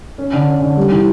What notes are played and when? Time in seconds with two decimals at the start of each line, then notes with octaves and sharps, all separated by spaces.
0.18 C#4
0.33 D3
0.48 C#4
0.62 D3
0.77 G3
0.91 E3